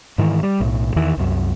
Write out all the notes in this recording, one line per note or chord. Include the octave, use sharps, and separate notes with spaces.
G#2 D#3 E3
G3
B1 A2
E2 D#3 E3
C2 F#2